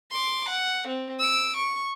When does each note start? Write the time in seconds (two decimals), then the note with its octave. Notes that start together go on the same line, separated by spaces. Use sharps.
0.11 C6 D6
0.49 F#5
0.88 C4
1.20 E6 D7
1.57 C#6